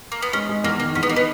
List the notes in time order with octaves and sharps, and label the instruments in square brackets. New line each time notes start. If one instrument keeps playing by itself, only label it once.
[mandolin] A#3
B3
[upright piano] G#3 [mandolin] C#4
[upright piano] G#3
[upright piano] E2 [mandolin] A#3
[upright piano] D#3 [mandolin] A#3
[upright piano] E2 [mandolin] C#4
[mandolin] B3
[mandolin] A#3 [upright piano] D#4
[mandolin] B3